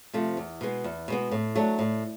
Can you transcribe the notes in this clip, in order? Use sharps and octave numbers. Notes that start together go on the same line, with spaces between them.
C3 F3 A3
E2
B2 G#3 B3
E2
B2 G#3 B3
A2
F#3 A3 D4
A2